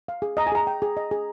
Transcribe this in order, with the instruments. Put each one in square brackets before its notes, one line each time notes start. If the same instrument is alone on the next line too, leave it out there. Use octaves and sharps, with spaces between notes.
[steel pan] F5
G#4
[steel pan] D#5 [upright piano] A#5
[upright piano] G#5
[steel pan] G#4 [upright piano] A#5
[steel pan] G5
G#4
D#5
G#4